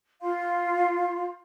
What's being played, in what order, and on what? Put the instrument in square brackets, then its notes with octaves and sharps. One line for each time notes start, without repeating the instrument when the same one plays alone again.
[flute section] F4 F5 C6